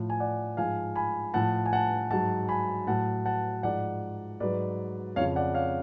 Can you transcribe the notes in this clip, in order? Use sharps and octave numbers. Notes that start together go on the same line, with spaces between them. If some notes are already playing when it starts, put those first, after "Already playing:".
Already playing: A2 F3
G#5
D5 F#5
G#2 F3 F5 G#5
G#5 B5
A2 F3 F#5 A5
G#5
F#5 A5
G#2 F#3 F#5 A5
G#5 B5
A2 F#3 F#5 A5
F#5 A5
G#2 F3 D5 F#5
G#2 F#3 B4 D5
F2 C#3 F3 C#5 F5
D5 F#5
C#5 F5